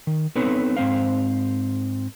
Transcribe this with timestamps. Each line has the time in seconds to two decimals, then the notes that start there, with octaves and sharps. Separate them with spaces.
0.07 D#3
0.35 B3 C4 D#4 A4 B4 C#5
0.77 G#2 C4 C5 F5